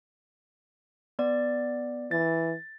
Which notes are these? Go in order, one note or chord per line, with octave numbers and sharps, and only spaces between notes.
B3 D5
E3 A6